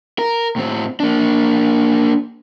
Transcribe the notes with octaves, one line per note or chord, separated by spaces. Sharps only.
A#4
A2 C4
A#3 D4